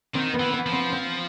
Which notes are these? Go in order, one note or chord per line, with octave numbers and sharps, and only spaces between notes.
D#3 C4
B3
E3
B3
F3
C4
C4